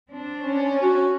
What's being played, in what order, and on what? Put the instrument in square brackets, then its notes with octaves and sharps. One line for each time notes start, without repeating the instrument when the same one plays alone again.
[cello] C4 D4
[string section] C#4
[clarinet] F#4